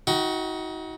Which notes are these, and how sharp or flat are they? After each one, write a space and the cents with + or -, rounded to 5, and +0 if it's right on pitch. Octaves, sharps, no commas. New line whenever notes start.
D#4 +35 F#4 +0 G5 -20